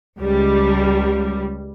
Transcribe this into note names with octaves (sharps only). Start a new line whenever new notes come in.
C#2 G3